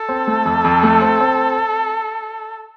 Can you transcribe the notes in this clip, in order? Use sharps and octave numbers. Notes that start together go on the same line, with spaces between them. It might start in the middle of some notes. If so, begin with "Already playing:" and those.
Already playing: A4
C4
A3
F2
F2
A3
C4
C4